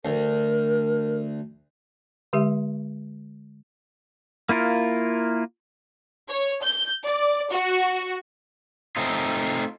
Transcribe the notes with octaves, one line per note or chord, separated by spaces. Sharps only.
D2 A#4
D3 G#3 G4 E5
A#3 E4 F4 A#4
C#5
G6
D5
F#4
A3 C4 D#4 F4